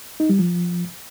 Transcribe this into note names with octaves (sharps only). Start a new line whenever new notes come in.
D#4
G3
F3